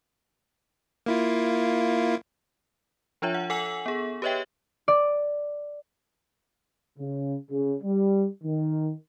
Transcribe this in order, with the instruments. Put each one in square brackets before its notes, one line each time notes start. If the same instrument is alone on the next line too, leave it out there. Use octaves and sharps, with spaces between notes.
[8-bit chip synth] A#3 E4 F4
[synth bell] F3 D4 F4 C#5 E5
F#5
A4 F#5 G#5 E6 F#7
B3 G#4
G4 B4 C#5 D#5 E5 G5
[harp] D5
[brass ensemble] C#3
C#3
G3
D#3